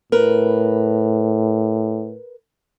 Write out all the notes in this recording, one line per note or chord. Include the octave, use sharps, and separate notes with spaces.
A2 A#4 B4